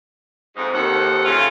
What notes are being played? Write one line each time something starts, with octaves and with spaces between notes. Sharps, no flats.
F2 G#2
D#2 F3 A4 F#5
C#3 A3 F4